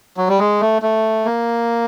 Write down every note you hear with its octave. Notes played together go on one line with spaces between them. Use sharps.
F#3
G3
G#3
A3
A3
A#3